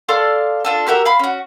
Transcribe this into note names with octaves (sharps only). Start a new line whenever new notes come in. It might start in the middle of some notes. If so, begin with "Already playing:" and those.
A4 D5 F5 C6
D4 F4 A4
F#4 G4 A#4 E5
F5 B5 C6
C#4 F#4